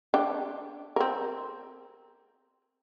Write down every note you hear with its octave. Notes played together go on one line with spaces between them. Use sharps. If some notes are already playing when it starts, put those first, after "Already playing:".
D4 G5
C4 A#4